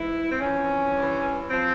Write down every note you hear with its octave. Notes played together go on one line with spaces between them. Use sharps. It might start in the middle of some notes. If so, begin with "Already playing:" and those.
Already playing: G#2 E3 E4
C4
F2 E3 C#4
G2 E3
F3 C4